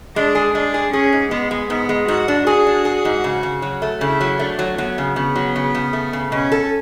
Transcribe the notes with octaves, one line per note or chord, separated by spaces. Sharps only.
G#3 D4
G#4
G#3 D4
G#4
C#4 G#4
G#2
G#3 B3
G#3
G#2 B3
G#3
G#2 F#4
D4
F#4 G#4
D4
G#4
G#2
C#3
C#3
F#3
A3
C#3 E4
F#3
A3 D4
F#3
F#3 B3
C#3
C#3 B3
F#3
C#3
C#3
A3
C#3
B2 C#4
A4